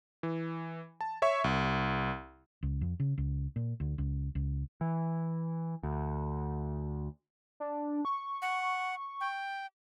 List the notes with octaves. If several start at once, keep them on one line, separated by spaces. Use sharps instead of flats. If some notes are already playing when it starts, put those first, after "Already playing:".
E3
A5
C#5 E5 C#6
C2
C#2
F2
C#3
C#2
A#2
D2
C#2
C#2
E3
D2
D4
C#6
F#5
G5